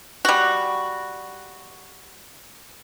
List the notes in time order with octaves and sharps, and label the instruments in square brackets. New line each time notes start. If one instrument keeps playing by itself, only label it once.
[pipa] G3 F#4